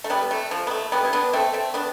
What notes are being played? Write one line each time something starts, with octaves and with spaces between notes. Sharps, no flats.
A3
G3 B3
A3
F3
B3
A3
G3 B3
E4
B3 D4
A3 C4
A3 C4
B3 D4